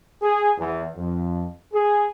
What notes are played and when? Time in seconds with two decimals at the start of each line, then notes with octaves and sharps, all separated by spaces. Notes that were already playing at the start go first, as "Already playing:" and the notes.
0.22 G#4
0.58 E2
0.96 F2
1.73 G#4